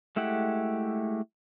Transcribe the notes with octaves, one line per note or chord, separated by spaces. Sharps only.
G#3 A3 E4 G4 F#5